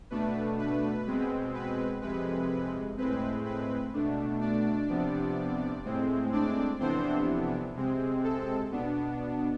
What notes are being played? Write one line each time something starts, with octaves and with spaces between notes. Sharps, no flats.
B2 A3 D4 B4
B4
B2 G#3 C4
B4
F2 C3 G#3 B4
A2 G#3 C4 B4
B4
B2 A3 D4
D4 D5
C3 F3 B3 D4
A2 G#3 C4
D4 D5
F2 C3 E3 B3 C4 D4 C5
C3 G#3 C4
A4
B2 B3 D4